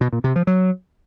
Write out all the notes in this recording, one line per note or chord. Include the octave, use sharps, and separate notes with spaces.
B2
A#2
C3
F3
F#3